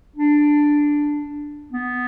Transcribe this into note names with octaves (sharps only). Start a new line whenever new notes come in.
D4
B3